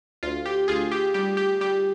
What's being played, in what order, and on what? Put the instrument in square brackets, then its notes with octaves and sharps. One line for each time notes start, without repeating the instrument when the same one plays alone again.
[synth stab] D2 F4
G4
D2 F4 G#4
G4
G3 G4
G4
G3 G4